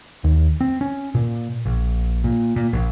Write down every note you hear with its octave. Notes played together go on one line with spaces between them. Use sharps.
D#2
C4
C#4
A#2
A#1
A#2
A#2
A#1